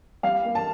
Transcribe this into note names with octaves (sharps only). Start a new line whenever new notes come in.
G3 F5
A#3
A5